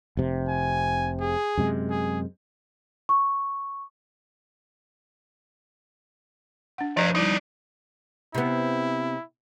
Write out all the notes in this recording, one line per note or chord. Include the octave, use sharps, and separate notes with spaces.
F1 C3
G#5
G#4
F#2 C3 G#3
G#4
C#6
D4 F#5
F3 B4 D5 D#5 A#5
G3 D#4 E4 D5
C3 B3 E4